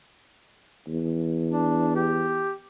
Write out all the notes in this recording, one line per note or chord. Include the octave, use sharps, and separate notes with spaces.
E2
D4
G4